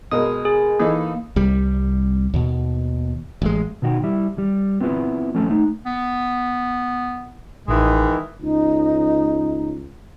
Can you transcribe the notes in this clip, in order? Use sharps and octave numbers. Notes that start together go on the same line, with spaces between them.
B2 G#3 A#4 D#6
G#4
E3 A#3 D#4 A4
C2 G3
D#2 B2
A1 G#3
B2 D#3 F#4 D#5 G5
G3 E4 E5
G3
B3 C4 E4 F4 B4
F3 A3 C4 C#4 A4
A3 D#4
B3
A1 D#3 E3 G#3
C#2 D#4